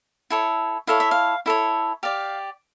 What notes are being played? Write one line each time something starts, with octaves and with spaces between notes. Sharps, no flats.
E4 A4 C#5
E4 A4 C#5 F5
E5
F5
E4 A4 C#5
G4 D5 F5